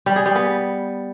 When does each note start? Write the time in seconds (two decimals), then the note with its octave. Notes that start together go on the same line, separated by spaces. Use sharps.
0.06 G3
0.16 G#4
0.26 G3
0.35 B3